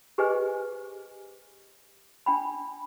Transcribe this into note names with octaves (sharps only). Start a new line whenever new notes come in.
G4 G#4 B4 C5 D#5 G#5
D4 G5 B5